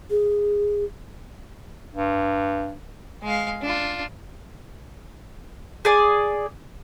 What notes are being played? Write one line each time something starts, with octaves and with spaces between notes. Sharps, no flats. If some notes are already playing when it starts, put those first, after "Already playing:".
G#4
G2
G#3 F5
D4 F4
G#4 D5 G#5